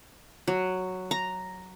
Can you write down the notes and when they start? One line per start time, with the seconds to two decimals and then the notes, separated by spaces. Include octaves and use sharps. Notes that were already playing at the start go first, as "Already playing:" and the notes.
0.48 F#3
1.11 A#5